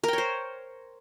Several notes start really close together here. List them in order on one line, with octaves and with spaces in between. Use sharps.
A#4 G5 C#5 C5